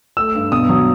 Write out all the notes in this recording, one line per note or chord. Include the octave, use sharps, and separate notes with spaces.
A3 E6
G2
B2 D#6
F#3